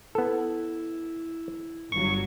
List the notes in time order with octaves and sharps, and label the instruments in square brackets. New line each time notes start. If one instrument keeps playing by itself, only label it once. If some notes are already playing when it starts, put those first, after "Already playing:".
[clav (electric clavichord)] B3 A4 [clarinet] E4
[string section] G1 F#3 [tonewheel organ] C#6